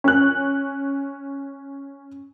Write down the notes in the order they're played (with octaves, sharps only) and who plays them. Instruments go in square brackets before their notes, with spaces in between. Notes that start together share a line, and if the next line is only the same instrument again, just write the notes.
[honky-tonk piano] C#4 F#6